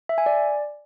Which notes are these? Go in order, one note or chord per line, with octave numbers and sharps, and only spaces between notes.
E5
G#5
D5